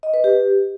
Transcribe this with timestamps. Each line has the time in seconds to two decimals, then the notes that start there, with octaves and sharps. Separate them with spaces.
0.03 D#5
0.14 B4
0.24 G4